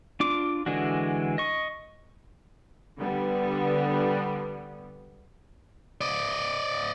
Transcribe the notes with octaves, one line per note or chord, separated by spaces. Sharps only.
D4 F4 D6
D3 E3 G#3 D4 F#4
D#5 C#6
D3 G3 B3
D5 D#5